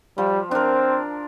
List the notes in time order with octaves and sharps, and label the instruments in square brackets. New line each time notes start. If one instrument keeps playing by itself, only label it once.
[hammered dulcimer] F3 [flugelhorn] G3
[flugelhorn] C4 [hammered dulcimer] D4 A#4